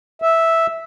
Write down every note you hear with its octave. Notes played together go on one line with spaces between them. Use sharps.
E5